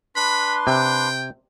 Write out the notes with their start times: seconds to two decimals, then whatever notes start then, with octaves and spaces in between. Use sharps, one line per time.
0.16 D4 B4 B5 C6
0.67 C3 G5